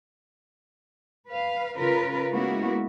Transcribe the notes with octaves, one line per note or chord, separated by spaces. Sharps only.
B4 F5
C#3 F4 A#4 B4
G#3 A#3 B3 C#4 E4 F#4